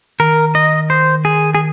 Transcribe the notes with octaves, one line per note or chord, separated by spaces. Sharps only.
D#3 A#4
D#5
C5
G#4
G#4